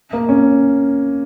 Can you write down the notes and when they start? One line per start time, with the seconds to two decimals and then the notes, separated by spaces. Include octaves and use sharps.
0.13 A#3
0.29 C#4